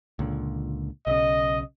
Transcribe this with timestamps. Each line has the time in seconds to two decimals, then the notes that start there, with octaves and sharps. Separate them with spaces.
0.19 C#2 A#2 D3
1.07 B1 C#3 D#5